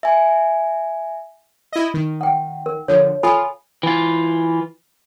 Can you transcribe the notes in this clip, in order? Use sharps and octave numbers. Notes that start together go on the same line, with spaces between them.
E5 G#5
E4 D#5
D#3
F#5 G5
A#4
D3 F3 C#5
F4 A4 G#5 B5
E3 F4